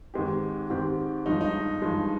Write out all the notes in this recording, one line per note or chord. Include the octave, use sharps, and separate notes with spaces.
G#2 D#3 G#3 C4 G4
G#2 D#3 G#3 C4 G4
G2 F3 G#3 D#4
D#4
G2 F3 G#3